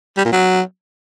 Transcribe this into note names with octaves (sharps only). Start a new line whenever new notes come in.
G3
A#2
F#3